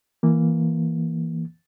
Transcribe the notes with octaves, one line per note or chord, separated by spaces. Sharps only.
E3 A#3